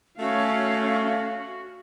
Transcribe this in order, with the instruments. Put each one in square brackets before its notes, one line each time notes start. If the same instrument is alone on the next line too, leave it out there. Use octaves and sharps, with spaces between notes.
[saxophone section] A3 [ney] C#4 [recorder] F#4 [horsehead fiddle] F5